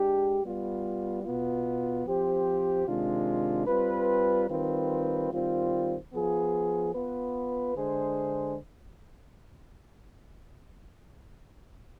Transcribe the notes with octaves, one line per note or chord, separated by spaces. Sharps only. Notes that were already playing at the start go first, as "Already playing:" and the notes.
Already playing: G#3 D4 G4
G3 B3 F4
B2 B3 F4
F3 C4 G4 C5
C3 D#3 G#3 D4 F4
G3 C4 F4 B4
D#3 G3 C4 F4 B4
D#3 G3 C4 F4 C5
F3 B3 F4 G#4
B3 F4 B4
D3 G#3 D4 G#4 C5